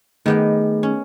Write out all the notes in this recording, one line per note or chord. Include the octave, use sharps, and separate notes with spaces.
D#3 A3 B3 G#4 G5
C#4